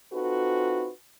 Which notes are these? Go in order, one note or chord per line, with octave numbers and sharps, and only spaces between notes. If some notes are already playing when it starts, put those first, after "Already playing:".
C4 D#4 F4 F#4 A4 B4